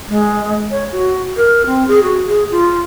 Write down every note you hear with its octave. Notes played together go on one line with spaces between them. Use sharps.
G#3
C#5
F#4
A#4
C4
G#4
F#4
G#4
F4